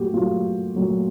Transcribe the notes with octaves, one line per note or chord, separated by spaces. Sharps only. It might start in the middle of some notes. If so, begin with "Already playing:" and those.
Already playing: A#2 F#3 A3 F#4 G4
A#2 F#3 A3 F4
A#2 F#3 A3